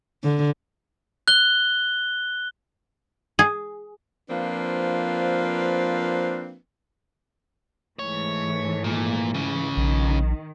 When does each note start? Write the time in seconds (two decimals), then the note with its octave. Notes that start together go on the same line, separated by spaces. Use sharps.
0.24 D3
1.28 F#6 G7
3.39 G#4
4.30 F3 A#3 C4 D4 F4 B4
7.99 G#2 E3 A3 C#5
8.84 A#2
9.34 C#2 C#3
9.77 A#1 D#3